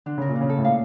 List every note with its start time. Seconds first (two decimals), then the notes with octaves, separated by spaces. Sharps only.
0.06 D3 D4
0.18 C#3 A#4
0.29 A#2
0.36 C#3 F4
0.50 A4
0.58 A2
0.65 A#2 F5